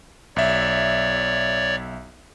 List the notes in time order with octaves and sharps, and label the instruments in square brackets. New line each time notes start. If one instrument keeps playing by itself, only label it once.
[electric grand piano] B1 E5 [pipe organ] C#5 D5